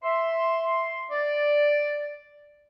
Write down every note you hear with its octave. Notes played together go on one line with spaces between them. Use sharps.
E5 C6
D5